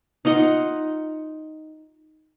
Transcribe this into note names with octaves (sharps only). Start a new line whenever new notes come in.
D#4 F4 D#5 F#5